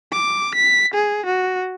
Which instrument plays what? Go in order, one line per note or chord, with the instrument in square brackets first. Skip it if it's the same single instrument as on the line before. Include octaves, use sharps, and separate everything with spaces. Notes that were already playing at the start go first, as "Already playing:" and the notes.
[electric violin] D6
B6
G#4
F#4